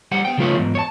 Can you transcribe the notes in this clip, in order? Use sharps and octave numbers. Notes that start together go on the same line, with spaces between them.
G3 C5 F#5
B3 G5
C#3 F3 A3 F4 B4 C#5
E2 G#2
C#5 A5